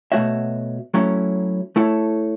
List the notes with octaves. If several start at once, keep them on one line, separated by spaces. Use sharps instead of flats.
B2 A3 F#4 C#5 E5
F#3 A3 C#4 E4 C#5
A3 E4 A4 C#5